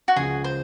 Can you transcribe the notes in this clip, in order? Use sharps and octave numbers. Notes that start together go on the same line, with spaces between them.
F#4
C#2 C#3 F3 G#4
C5